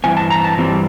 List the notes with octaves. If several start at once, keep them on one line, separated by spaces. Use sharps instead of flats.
G2 E3 C4 G#5
A5
A#5
A5
G2 E3 G3 C4